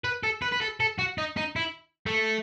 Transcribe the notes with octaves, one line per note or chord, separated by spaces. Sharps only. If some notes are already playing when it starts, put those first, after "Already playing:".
B4
A4
B4
B4
A4
A4
F#4
D#4
D#4
E4
A3